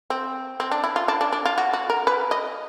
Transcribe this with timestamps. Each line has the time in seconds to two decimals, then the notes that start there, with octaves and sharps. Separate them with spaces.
0.10 C4
0.60 C4
0.71 D4
0.84 E4
0.96 F4
1.08 D4
1.21 D4
1.32 D4
1.45 F4
1.58 F#4
1.73 F#4
1.90 A#4
2.07 B4
2.31 D#5